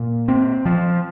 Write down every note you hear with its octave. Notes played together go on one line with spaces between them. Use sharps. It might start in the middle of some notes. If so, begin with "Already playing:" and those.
Already playing: A#2
C4
F3